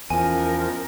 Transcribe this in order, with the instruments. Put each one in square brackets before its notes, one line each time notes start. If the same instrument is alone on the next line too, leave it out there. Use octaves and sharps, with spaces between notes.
[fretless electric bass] E2 [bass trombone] F3 [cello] C#4 A#4 [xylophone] G#5